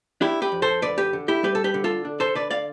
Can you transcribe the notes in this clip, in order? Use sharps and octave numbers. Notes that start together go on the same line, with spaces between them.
D4 E4 G4
G4 B4
F2
A4 C5
D3 B4 D5
G4 B4
D3
E4 G4
G3 G4 B4
A4
G4 B4
D3
F4 A4
D4
A4 C5
D3 B4 D5
D5 F5